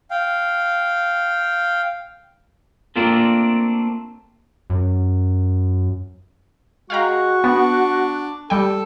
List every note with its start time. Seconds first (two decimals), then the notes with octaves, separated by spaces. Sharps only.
0.11 F5 G5
2.96 A3 A#3 C4 D4 F4 A4
4.70 F#2
6.90 G#3 F#4 F5 G5 A#5 C#6
7.44 B3 D4
8.50 G3 A4 G5